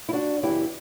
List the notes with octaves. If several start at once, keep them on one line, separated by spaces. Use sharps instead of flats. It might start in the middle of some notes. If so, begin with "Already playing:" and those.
E4
D4 F#4
F#2 C#3 E3 B3 E4 G4